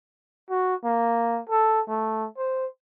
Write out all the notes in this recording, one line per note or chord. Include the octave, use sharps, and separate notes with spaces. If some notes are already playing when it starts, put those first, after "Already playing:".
F#4
A#3
A4
A3
C5